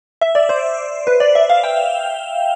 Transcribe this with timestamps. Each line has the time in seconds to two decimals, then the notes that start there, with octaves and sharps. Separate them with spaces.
0.21 E5
0.35 D5
0.49 C5
1.07 B4
1.20 D5
1.35 E5
1.50 F5
1.64 G5